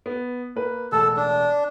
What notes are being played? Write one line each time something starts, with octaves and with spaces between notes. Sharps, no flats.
B3
A#3 B4
E1 A2 A4 A5
D4